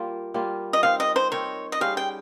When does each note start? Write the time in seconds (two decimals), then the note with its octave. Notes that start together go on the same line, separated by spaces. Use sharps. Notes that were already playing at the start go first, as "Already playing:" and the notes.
Already playing: G3 A#3 F4
0.34 G3 A#3 F4
0.73 D#5
0.83 C4 D#4 A#4 F5
1.00 D#5
1.16 C5
1.32 C4 D#4 A#4 C#5
1.72 D#5
1.81 G3 C#4 G#4 C5 F5
1.97 G5